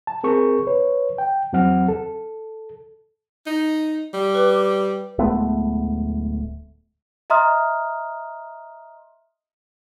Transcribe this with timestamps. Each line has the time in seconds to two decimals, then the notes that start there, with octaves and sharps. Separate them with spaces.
0.07 A5
0.24 C4 G#4 A#4 C#6
0.67 B4 C#5
1.18 G5
1.53 E2 F#3 C4 F#5 F6
1.88 A4
3.46 D#4
4.13 G3
4.35 B4 D6
5.18 D1 G#3 A3 B3
7.30 D#5 E5 A#5 C6 D#6 F6